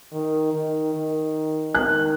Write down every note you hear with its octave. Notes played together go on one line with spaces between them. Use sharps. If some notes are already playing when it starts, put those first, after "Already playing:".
D#3
D#3
D#3
D#3 F#6